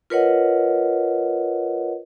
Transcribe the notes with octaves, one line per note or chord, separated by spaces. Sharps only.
F4 A#4 B4 C#5 D#5 F#5